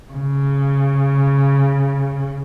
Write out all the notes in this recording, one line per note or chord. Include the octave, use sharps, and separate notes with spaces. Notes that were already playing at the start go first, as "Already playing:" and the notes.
C#3